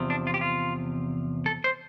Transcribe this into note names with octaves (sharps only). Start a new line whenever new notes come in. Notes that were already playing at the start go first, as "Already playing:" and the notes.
Already playing: E2 C3 F3
D4
F4
G4
F4
A4
C5